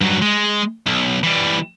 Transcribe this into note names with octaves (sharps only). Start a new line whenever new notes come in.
G2 F#3
G#3
B1
E3 G3